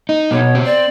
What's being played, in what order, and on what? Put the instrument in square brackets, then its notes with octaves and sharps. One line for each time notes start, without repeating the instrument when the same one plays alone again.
[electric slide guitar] D#4
[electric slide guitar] B2 [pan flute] C#5
[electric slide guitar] C4
[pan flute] D5